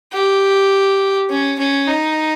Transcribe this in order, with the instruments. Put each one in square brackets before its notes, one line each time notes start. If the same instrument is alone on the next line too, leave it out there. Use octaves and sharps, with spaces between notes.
[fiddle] G4
C#4
C#4
D#4